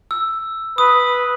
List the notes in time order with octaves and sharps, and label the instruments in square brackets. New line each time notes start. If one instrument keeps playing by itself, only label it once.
[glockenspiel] E6
[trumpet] B4 [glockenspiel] D#6